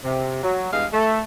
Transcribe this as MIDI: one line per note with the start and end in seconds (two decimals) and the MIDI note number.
0.04 0.41 48
0.43 0.69 54
0.72 0.86 40
0.72 0.86 43
0.72 0.86 56
0.72 0.86 68
0.72 0.86 77
0.93 1.20 57